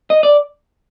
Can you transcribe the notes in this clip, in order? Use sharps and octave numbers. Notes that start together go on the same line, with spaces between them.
D#5
D5